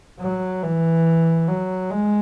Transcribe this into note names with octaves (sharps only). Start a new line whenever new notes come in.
F#3
E3
F#3
G#3